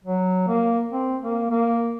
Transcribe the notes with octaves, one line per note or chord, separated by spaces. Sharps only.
F#3
A#3
C4
A#3
A#3